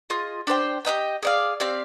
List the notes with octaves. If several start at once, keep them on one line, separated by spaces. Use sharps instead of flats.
F4 G#4 D#5
D4 G4 C5 G5
G4 A#4 D#5 G5
G#4 D5 F5
C4 G4 D5 F5